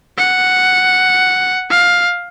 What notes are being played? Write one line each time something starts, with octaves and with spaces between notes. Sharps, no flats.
F#5
F5